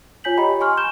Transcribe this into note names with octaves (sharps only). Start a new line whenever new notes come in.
F4 C#5 G#5 G6 B6 F#7
G4 C#5 D#5 G5 A#5 B5
G#5 C6 C#6 F6
G6 E7 G7